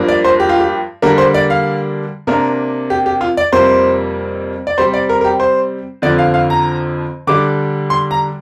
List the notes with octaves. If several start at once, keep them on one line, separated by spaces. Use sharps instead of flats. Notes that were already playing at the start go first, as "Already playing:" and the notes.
Already playing: G2 F3 A#3 D4
D5
C5
G4
F4
G4
D3 G3 A#3 D4 A#4
C5
D5
F5
C3 A#3 D4 A#4
G4
G4
F4
D5
F2 C3 G3 A#3 C5
D5
C3 G3 C4 C5
D5
A#4
A#4
G4
C5
F2 D3 F3 D5
F5
F5
A#5
D3 G3 D4 D6
C6
A#5